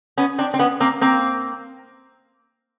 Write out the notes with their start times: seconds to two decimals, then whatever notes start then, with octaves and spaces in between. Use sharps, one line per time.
0.17 B3 C#4
0.38 C4 D4
0.54 C4
0.59 B3 C#4
0.80 A#3 C4
1.01 A#3 C4